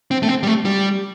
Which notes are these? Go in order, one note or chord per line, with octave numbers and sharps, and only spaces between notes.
C4
A3
C4
G3
A3
G3